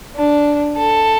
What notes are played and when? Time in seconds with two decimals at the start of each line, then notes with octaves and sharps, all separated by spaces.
0.15 D4
0.77 A4